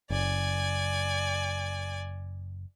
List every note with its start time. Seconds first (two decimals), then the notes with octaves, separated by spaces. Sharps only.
0.10 F#1 D5 G#5